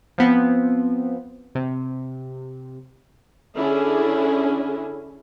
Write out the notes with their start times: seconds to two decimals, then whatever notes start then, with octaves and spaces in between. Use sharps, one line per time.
0.18 F3 B3 C4
1.55 C3
3.57 D3 C#4 D4 E4 G#4